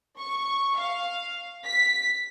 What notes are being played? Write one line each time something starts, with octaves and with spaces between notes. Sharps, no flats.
C#6
F5
B6